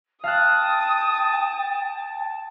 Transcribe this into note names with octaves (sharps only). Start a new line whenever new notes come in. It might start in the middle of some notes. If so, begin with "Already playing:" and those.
F5 G5 A5 D#6 F6 F#6